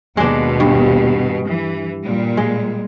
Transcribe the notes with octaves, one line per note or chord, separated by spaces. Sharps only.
D#2 B2 G#3 D4
G2
E3
A#2 G3
G#3